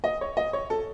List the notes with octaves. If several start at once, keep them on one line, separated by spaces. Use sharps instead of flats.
D#5
C#5
D#5
C#5
A4